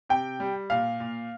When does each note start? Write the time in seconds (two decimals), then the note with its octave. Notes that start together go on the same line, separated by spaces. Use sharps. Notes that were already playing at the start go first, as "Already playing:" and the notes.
0.09 C3 G5
0.40 G3
0.70 A#2 F5
1.00 A#2